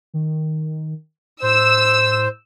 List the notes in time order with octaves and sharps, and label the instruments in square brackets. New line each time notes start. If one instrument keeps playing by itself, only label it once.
[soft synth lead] D#3
[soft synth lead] A2 [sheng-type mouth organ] C5 [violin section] E6